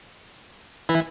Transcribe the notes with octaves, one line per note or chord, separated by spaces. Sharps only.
E3 E4